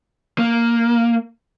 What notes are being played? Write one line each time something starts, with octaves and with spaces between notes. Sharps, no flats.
A#3